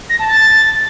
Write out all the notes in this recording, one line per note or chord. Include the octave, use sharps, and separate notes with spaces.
A#6
A5
A6